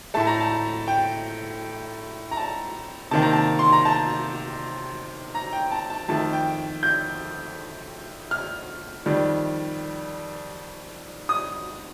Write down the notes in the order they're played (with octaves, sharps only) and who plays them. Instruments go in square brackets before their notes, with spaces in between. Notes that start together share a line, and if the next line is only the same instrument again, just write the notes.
[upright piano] A2 A3 A5
A#5
A5
G5
A#5
A5
C3 D#3 A#3 A5
A#5
A5
C6
A#5
A5
A#5
G5
A5
A5
F2 D#3 A3 A5
G5
G6
F6
F2 D#3 G3
D#6